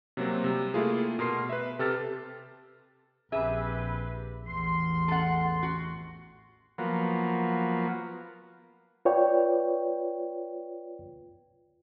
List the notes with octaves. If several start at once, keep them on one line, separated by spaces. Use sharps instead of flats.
C3 F#3 A#3 C4
C3 G3
A3 A#3 E4 F4 G#4
B2 A#4 C6 C7
B4 E5
C3 G4 A4 F6 A6
A#1 C4 G4 G#4 B4 E5
A1 E2 C6
A4 F#5
F#4
F3 F#3 A#3 B3
F4 B4 C#5 D5 G5